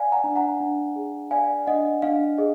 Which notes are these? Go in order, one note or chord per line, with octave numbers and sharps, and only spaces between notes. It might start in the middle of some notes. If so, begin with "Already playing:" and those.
Already playing: D5 F5 G#5
F#5 A#5
D4
F#5 A#5
D4
G#4
D5 F5 G#5
D4 D#5 F#5
D4 F5
G#4 D#5